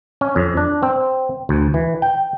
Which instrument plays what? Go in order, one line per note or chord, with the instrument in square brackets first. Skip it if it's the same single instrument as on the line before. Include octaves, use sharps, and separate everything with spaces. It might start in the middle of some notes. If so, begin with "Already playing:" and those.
[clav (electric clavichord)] C#4
F2
D4
C4
D2
E3
G5